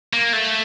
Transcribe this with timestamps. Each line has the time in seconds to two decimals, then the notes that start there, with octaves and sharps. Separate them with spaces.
0.13 A#3
0.33 A3